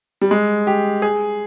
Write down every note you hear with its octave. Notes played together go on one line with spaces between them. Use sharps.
G3
G#3
G4
G#4